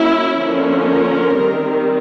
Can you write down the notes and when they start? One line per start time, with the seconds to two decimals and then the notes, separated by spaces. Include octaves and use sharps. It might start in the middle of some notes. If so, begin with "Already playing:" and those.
Already playing: F#3 A#3 C#4 E4
0.38 D3 F3 A#3 C#4
0.88 A#4
1.37 D#3 G3 C4